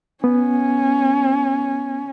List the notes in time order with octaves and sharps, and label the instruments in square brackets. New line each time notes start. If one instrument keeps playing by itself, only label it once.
[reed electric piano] B3 [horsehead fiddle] C#4